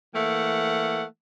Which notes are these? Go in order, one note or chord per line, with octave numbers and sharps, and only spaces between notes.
E3 A3 A#3 F#5